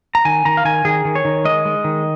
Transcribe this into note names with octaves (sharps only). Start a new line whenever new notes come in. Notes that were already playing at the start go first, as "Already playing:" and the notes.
A#5
D#3 G#5
D#3 A#5
F5
D#3 G#5
D#3 G#4
D#3
C#5
D#3
G#3 D#5
G#3
D#3